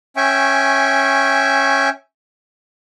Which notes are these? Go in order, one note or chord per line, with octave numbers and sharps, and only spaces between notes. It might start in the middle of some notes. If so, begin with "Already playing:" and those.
C#4 E5 G5 G#5 C#6